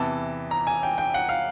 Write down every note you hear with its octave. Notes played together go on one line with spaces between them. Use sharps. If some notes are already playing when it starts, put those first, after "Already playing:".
Already playing: E2 C3 E3 A5
A#5
G#5
G5
G5
F#5
F5